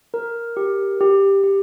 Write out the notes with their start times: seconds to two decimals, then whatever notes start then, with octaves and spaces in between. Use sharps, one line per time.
0.14 A#4
0.57 G4
1.01 G4
1.44 G4